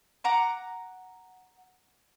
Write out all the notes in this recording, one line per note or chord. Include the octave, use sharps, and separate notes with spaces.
F#5 A#5 D6